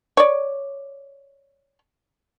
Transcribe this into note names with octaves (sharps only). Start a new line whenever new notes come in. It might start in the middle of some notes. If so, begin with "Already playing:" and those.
C#5 D5